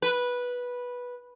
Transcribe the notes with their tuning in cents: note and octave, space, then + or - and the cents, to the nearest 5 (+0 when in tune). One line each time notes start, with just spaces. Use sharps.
B4 -10